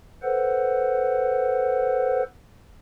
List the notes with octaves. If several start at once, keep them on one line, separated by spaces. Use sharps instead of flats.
A4 B4 C5 F#5